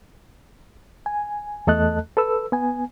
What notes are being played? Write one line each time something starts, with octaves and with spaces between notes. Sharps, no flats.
G#5
E2 A3 A4 D#5 A5 F#6
A4 B4 E6
B3 G#5